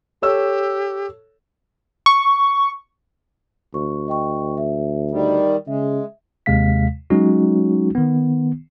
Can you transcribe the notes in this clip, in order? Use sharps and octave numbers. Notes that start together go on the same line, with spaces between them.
G4 A4 C#5 E6
C#6
D2 C#6
D#5 G5 C#6
E5
D#3 G3
C#3 G#3 E5
D#2 C3 G#3 F5 B6
F#3 G#3 C#4 D#4 F#4
D#3 B3